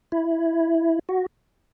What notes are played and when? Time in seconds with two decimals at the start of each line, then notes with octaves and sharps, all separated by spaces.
0.12 E4
1.09 F#4